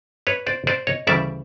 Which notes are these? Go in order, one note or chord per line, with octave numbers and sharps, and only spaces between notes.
B4 C#5
C5 D5
C5 D5
C#5 D#5
D2 C#3 E3 G3 D5 E5